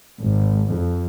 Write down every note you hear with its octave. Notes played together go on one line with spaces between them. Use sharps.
G#1
F2